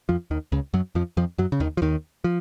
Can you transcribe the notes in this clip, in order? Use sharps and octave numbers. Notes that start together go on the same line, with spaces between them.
F2 F3
D#2 D#3
C#2 C#3
F#2 F#3
F2 F3
F2 F3
F#2 F#3
C#3
D#2 D#3
F3
D#2 D#3
F3